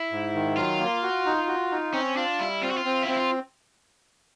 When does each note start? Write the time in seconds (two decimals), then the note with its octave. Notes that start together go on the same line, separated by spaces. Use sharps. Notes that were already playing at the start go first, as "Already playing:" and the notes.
Already playing: E4
0.11 G#2
0.34 D#3
0.57 F#3 F4
0.79 A#3
1.03 F#4
1.26 D#4
1.48 F#4
1.71 D#4
1.93 C4 C#4
2.17 D4 F4
2.39 G3 E4
2.62 C4 F4
2.70 F#4
2.77 F4
2.85 C4
3.03 C4 E4
3.17 F4